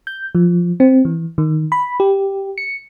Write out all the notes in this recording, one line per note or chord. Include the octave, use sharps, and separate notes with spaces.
G6
F3
C4
E3
D#3
B5
G4
C#7